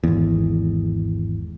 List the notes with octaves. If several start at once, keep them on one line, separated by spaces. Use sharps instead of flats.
G#1 E2